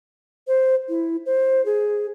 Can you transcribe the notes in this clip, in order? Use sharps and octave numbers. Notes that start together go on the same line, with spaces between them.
C5
E4
C5
G#4